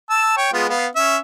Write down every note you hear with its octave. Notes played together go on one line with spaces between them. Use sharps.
A5 E6
C#5 G5
G#3 B3 F4
B3 F5
C#4 E5